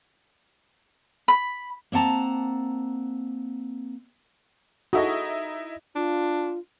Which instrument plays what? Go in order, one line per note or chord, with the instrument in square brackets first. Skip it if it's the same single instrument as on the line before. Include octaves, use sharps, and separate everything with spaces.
[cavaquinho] B5
[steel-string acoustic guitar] A#3 C4 F#5 A5 A#5
[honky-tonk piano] D#4 E4 D#5 [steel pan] F#4 G#4 A4
[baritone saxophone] D4 [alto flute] F4